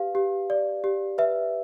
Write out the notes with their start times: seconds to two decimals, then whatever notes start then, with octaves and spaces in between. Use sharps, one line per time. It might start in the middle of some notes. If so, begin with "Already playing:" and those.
Already playing: G4 B4 F5
0.15 G4
0.50 D5
0.84 G4
1.18 B4 E5